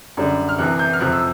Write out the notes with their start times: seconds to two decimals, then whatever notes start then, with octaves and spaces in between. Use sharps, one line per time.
0.17 F#2 D3 G3
0.49 F6
0.58 C2 C3 E3 F#6
0.79 G6
0.93 F6
1.00 F2 C3 F3 F#6
1.12 E6